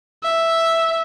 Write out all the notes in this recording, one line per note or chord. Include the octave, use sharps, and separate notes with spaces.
E5